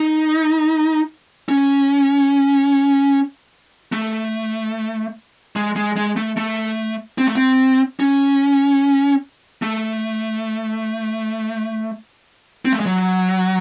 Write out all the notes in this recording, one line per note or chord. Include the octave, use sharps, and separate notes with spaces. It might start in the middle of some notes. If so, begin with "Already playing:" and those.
Already playing: D#4
C#4
A3
G#3
G#3
G#3
A3
A3
C4
A3
C4
C#4
A3
C4
A3
G#3
F#3